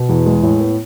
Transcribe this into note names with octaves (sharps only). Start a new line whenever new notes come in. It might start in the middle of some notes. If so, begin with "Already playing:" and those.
Already playing: B2
E2
G#3
A2
B3